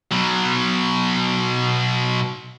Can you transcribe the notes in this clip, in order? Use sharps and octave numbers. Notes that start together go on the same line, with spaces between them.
B2 F#3